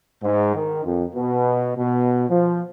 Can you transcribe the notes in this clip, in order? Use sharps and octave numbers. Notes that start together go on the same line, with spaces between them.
G#2
D#3
F2
B2
B2
F3